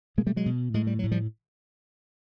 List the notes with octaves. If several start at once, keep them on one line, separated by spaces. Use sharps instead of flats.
B2 G#3 A#3
G3 A3
F#3 G#3
B2
A2 G#3
G3
A2 F#3
F3 G3